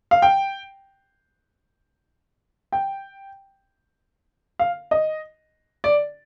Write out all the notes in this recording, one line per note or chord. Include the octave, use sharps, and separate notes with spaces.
F5
G5
G5
F5
D#5
D5